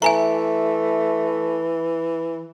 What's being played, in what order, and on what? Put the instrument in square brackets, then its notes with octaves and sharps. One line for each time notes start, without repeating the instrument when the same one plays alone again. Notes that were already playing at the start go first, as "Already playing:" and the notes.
[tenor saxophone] E3 [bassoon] A3 [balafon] E5 G#5 A#5